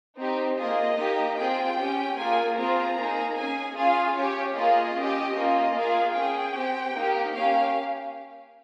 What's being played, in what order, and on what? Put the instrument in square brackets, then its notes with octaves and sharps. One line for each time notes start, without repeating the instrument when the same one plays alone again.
[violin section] C4 D#4 G4
A#3 F4 G#4 D#5
A#3 D#4 G4
C4 F4 G#4 G5
C#4 G4
A#3 F4 G#4 G#5
C4 F4 G#4 A#5
A#3 D#4 G#4
C#4 G#4 G#5
C#4 F4 G#4 F5
C#4 G4 C#5
A#3 F4 G#4 D#5
C#4 G4
A#3 C#4 F4
A#3 F4 G#4 F5
C#4 G#4 G5
C4 G4
A#3 D#4 G4
A#3 C#4 G4 F5